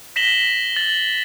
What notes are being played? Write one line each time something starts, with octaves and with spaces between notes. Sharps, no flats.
A#6 B6 E7 F#7 G7
A6 F#7